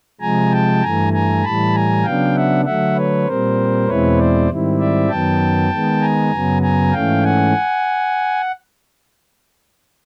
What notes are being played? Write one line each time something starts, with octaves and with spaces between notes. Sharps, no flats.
C3 F3 G#3 G#5 A#5
G5 A5
G2 E3 A3 G#5 A#5
G#5 A#5
A2 E3 G3 A5 B5
G#5 A#5
C#3 F#3 B3 D4 F5 G5
E5 F#5
D3 F#3 A3 E5 F#5
B4 C#5
A#2 G3 C4 A#4 C5
E2 B2 G#3 C4 E4 B4 C#5
C5 D5
G#2 D#3 G3 C4 E4
D5 E5
F#2 D#3 F#3 B3 G5 A5
D#3 G#3 B3
G#5 A#5
F#2 C#3 F#3 B3
G#5 A#5
G#2 E3 A3 C#4 F5 G5
F#5 G#5